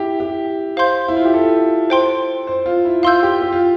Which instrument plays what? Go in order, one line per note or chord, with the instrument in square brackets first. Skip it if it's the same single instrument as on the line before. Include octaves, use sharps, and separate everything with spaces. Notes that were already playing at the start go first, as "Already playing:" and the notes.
Already playing: [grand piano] E4 G4
G4
[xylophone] C5 F5 C6 G6
[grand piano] E4
F4
G4
A4
[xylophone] C5 G5 C6
[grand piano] C5
F4
E4
[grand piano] F4 [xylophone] F5 C6 E6 G6
[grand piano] G4
G4
F4